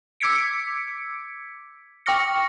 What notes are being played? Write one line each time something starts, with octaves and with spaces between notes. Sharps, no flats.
D6 E6 G#6 B6 C#7 D7
G5 C#6 D6 F6 A#6 C#7